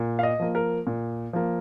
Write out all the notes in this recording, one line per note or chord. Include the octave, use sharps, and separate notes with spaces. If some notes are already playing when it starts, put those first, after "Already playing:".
Already playing: A#2
F5
D#5
F3 A#3
A#4
A#2
F3 A#3